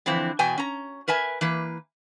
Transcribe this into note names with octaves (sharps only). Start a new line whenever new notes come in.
D3 E3 F3 C4 E4
E2 B2 G5 G#5
C#4 A#5
A#4 B4 E5 G#5
E3 A#3 B4